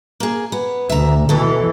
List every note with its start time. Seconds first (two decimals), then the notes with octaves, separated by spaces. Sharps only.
0.20 A#3 G#4
0.52 B3
0.89 D2 E5 A#5
1.29 B2 E3 A4